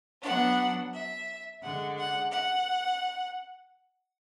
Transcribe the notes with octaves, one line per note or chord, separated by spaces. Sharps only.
F#3 B3 D4 F#5
E5
D3 G#3 D4 F#5
F#5
F#5